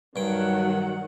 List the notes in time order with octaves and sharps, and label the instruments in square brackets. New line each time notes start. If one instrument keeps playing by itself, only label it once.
[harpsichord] G2 G5 [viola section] D#3 F#3 F#5